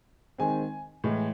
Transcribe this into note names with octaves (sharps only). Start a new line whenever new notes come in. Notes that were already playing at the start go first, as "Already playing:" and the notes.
D#3 G#3 C4 G#5
A2 E3 G#3